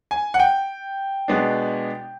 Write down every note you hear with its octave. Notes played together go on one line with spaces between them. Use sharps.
G#5
F#5
G5
B2 G#3 B3 D4